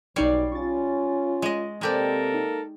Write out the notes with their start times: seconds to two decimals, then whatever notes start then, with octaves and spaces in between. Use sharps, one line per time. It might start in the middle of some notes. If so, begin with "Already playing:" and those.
0.16 B1 B2 G3 D#4 C#5 D5 C7
0.52 C#4 F4 C#6 A6
1.42 G#3 D#5
1.81 C3 G#3 A#3 C4 G4 A4 A#4 D5
2.34 D#4